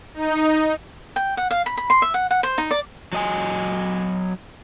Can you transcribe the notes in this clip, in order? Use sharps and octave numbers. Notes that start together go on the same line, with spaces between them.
D#4
G5
F#5
F5
B5
B5
C6
E5
F#5
F#5
C5
D#4
D5
F#3 D#5 G#5